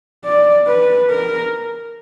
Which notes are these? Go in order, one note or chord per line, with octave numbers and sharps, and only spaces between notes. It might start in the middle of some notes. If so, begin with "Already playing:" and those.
D5
B4
A#4